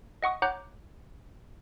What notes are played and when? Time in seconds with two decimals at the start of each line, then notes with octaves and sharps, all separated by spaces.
0.23 D#5 F#5 C#6 D#6
0.42 C#5 F#5 A#5 D6 F#6 G6